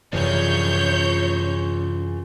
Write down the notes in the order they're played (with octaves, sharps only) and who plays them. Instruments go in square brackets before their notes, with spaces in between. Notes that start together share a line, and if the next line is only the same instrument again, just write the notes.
[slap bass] F#2 C3 E3 [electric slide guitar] F4 G#4 D5 [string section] C#5 G6